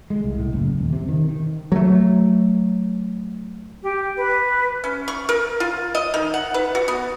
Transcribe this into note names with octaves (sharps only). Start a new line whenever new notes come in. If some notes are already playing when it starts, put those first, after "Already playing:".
G#3
C2
A2
F#1
D#1
C3
D#3
D#3
F#3 A3
G4
B4
C#4
C#6
A#4
F4
D#5
D#3
F#5
B4
F#4
B3